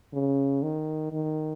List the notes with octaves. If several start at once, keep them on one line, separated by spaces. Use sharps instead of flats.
C#3
D#3
D#3